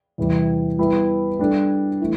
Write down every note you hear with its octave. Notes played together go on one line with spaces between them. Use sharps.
E2 C3 E3 G3
G3 B3 E4
G3 D4 A4
E3 A3